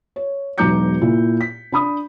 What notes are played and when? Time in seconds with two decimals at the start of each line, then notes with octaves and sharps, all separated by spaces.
0.16 C#5
0.58 E1 B1 A#5 D6 G6 C#7
1.01 A#2 E4
1.41 B6
1.72 D4 B5 D#6